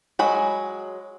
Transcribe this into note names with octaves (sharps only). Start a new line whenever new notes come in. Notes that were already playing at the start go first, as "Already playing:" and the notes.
F#3 G#3 C#5 G#5 B5